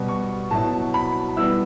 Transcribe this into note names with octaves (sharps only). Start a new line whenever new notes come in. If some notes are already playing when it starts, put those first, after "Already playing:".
Already playing: B2 G3 B3
C#6
B2 F#3 B3 E4 A5
B5
E3 G3 B3 E4 E6